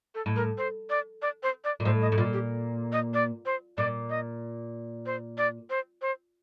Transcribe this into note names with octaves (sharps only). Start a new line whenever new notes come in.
A4
A2
A#4
C5
D5
D5
C5
D5
A#2
A2 C5
D#5
A2
A#2 F4
G4
D#5
D5
C5
A#2 D5
D#5
C5
D5
C5
C5